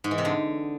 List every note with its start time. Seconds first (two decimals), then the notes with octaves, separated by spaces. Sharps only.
0.04 G#2
0.11 E3
0.18 C3
0.25 D3